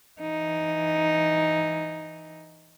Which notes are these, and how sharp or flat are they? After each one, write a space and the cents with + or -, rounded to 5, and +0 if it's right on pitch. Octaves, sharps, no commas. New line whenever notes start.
E3 +0 D#4 +0